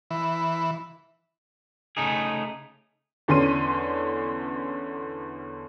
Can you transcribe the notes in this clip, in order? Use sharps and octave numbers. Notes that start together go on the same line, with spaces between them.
E3
C#3 A3 D#4 G#4
E2 D3 C#4 C6 D#7